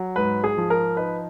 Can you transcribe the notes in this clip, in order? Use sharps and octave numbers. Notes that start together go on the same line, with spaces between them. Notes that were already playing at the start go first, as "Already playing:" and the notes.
Already playing: F#3
G#2 B4
G#4
F3
A#4
D#4 B4